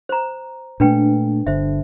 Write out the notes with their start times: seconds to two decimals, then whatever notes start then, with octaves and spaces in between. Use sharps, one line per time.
0.09 C5 A#5
0.80 A#2 A3 D4 B4 G5
1.47 G1 D3 C5 E5